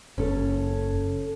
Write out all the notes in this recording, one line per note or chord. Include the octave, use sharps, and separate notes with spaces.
F#1 C#4 A4